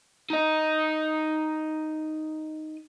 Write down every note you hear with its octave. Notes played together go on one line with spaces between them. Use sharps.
D#4 D#5